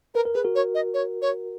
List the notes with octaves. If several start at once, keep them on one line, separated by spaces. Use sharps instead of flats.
A#4 B4
A#4
G#4 B4
F#4 A#4
C#5
D#5
C#5
C#5